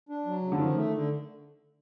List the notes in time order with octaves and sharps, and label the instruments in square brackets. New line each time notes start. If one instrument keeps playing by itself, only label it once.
[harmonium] D4
F#3
C#3
[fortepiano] D3
[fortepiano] D#3 [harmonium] F3
[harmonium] A3
D3